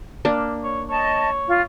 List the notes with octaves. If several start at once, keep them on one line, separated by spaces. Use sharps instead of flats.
A#3 D4
C#5
C#5 D#5 A5
F4